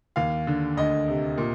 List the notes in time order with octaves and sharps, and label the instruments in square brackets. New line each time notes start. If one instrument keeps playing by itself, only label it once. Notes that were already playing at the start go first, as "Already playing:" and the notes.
[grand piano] D#2 F5
D3
D2 D#5
C3
A#2